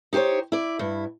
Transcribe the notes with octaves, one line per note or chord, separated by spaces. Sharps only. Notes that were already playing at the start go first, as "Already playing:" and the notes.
D#4 G4 G#4 C5 C#5
E4 D5
G2 E4